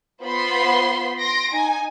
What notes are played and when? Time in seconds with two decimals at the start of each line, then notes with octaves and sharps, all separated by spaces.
0.22 B3 F4 C5 B5 C6
1.21 C6 A#6 D7
1.52 D#4 G#5